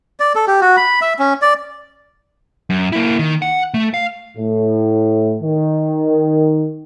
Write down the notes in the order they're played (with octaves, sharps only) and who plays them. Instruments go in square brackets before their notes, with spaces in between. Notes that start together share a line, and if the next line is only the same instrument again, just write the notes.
[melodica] D5
A4
G4
F#4
B5
E5
C#4
D5
[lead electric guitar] F#2
A#3 E4
D#3
F#5
A3
F5
[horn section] A2
D#3